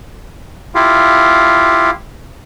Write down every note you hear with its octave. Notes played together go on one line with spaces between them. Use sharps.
E4 F4 G4 F5